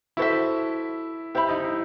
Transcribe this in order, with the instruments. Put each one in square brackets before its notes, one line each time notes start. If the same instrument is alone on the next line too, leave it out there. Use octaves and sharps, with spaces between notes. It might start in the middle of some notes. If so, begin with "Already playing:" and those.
[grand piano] E4 [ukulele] F#4 A4 C5 E5
[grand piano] E4 [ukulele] G4 C5 E5 B5
[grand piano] D#4
D#4
E4